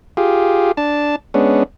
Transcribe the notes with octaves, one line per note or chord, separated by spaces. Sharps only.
F4 G4 G#4
D4 A5
G#3 B3 C#4 D4